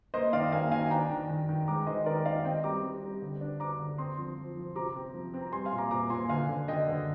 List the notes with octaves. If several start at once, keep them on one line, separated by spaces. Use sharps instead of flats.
A#3 C5 D#5
D#3 D5 F5
A#3 F5 G#5
D#3 F5 G#5
G#5
D4 G5 A#5
D#3
D#3
D#3
G#3 A#5 D6
D#3 C5 D#5
D#3 A#4 D5
D#5
D#3 D5 F5
C4 D#5 G5
G3 A#5 D6
C4
G3
D3
D4
D4 A#5 D6
D3
C4 C6 D#6
F3
F3
F3
C3 A#5 D6
C4
F3
C4
A#5
G3 G#5 C6
F5 G#5
A#2
A#5 D6
A#2 A#5 D6
A#2 G#5 C6
D3 F5 G#5
D3
D3 D#5 G5
D3